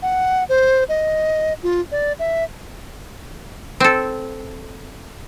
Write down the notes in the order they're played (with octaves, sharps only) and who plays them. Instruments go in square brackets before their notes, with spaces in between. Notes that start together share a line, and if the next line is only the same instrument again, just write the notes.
[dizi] F#5
C5
D#5
F4
D5
E5
[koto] C4 A4